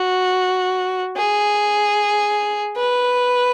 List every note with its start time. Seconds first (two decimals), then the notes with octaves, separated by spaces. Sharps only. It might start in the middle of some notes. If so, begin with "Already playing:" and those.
Already playing: F#4
1.17 G#4
2.77 B4